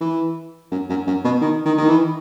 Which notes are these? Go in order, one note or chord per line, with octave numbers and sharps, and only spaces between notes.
E3
F#2
F#2
F#2
B2
D#3
D#3
D#3
E3